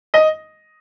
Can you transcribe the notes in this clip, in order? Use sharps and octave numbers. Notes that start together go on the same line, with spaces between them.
D#5